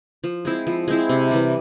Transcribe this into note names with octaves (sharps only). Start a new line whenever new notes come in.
F3
G#3 C4 E4
F3
G#3 C4 E4
C3
E3 G3